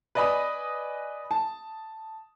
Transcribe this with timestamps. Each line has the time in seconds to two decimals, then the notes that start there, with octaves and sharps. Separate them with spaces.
0.15 B4 D5 D#5 G#5 B5 D#6
1.31 A5